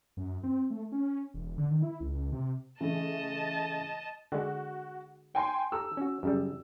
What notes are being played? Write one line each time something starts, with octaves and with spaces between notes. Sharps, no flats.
F#2
C4
A3
C#4
E1
D3
D#3
E4
C#2
C3
C#3 E3 A3 D#5 A5
D3 G#3 F#4
G5 G#5 C6
G4 A4 A#5 E6
C#4 F#4
F#2 C#3 G3